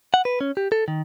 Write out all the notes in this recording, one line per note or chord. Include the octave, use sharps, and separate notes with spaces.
F#5
B4
C#4
G4
A4
D#3